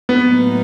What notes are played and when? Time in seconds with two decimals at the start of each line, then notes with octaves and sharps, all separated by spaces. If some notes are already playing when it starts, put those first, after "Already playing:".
0.09 B3
0.23 A2 F#3 A#3 D#4